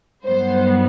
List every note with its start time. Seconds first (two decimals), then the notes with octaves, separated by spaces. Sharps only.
0.25 G2 D#3 F#3 B3 C5